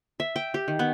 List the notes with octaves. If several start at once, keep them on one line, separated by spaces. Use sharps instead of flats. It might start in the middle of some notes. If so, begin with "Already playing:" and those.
E5
G5
G4
D#3
B3